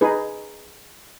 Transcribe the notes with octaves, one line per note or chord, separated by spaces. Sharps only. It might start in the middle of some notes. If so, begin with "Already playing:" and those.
D#4 G#4 B4